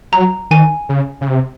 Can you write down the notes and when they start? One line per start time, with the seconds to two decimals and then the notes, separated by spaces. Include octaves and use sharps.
0.12 F#3 A#5
0.51 D#3 G#5
0.89 C#3
1.21 C#3
1.28 C3